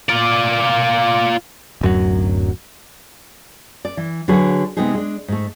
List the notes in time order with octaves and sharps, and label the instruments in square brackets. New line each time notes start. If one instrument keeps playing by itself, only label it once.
[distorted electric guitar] F4 D5
[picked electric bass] D1 F#2 F#3
[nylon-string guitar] D5
E3
D3 F#3 F#4 G#4 B4
C3 G#3 B3 C4 D#4 G#4
G#3 D4
G#2 A3